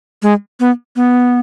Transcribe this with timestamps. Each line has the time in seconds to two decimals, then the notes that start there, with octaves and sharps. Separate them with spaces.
0.22 G#3
0.60 B3
0.96 B3